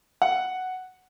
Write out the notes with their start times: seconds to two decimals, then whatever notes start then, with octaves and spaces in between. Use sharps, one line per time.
0.22 F#5